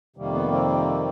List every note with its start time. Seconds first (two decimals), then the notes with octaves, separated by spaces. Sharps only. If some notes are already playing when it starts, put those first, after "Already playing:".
0.16 F2 C3 D#3 G3 A#3
0.34 B3
0.52 C4